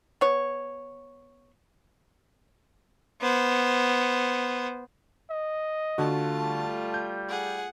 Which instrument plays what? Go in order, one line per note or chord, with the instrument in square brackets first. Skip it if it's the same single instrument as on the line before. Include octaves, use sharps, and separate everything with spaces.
[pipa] B3 C#5
[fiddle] B3 C5
[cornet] D#5
[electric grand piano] D3 F#4 [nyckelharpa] A3 F4 [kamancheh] A5
[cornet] G3
[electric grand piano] G6
[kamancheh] G#4 F#5